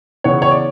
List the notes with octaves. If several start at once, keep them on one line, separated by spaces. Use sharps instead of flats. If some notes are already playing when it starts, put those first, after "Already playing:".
C#3 E3 B3 C#5
C#5
D5